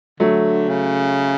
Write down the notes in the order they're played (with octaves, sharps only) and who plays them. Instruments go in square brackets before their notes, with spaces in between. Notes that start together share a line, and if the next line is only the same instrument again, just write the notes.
[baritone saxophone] D3 [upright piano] F#3 A3
[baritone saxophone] C#3